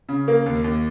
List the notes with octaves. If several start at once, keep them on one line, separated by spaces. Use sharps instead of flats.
C#3
A#3
D#2
D#2